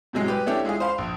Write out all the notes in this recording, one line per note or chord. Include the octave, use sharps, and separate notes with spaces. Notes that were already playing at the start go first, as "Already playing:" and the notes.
A2 C3 F#3 G#3
G3 G4 B4
A3 C#4 D4 E4 G4
G#3 E4 F4 G#4
C5 F5 B5 C6
A#1